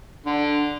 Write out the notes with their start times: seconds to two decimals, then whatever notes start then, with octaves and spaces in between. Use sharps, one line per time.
0.26 D3